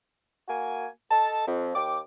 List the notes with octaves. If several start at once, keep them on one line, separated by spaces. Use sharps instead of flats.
A#3 F#4 G#5
A4 D#5 A5
F2
D#2 G5 D6